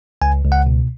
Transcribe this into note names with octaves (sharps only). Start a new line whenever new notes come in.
C#2 G#5
C#2
F#5
B2